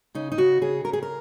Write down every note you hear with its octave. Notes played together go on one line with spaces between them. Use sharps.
C#3 D#4
D#4
C#3 F#4
C#3 G#4
C#3 A#4
G#4
A#4